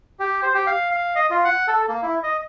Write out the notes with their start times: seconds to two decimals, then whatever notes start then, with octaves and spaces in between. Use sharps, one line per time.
0.20 G4
0.42 C5
0.54 G4
0.67 F5
0.91 F5
1.16 D#5
1.30 F4
1.44 F#5
1.68 A4
1.89 A#3
2.03 E4
2.23 D#5